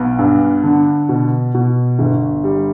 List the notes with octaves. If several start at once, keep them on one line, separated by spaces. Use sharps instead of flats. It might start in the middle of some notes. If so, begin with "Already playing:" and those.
Already playing: B1 B3
G2
D3
B2
B2
G1
G3